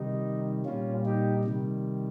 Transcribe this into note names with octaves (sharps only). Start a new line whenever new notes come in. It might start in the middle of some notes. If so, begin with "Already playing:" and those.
Already playing: C3 D#3 G3 D#4
A#2 G3 C#4 F4
D#4 G4
C3 D#3 G3